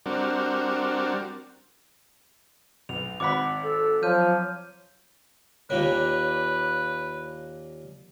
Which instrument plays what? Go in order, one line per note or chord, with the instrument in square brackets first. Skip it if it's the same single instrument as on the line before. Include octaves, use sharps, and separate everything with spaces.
[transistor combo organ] G3 C4 D4 F#4 A#4
[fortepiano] B1 [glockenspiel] F7
[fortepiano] G#1 F#5 B5 [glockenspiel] D6 B6
[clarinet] A4
[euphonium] F3 [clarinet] F#3 [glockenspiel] F6 G6 D#7
[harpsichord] D#2 A#2 A#3 [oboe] B4 [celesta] C#5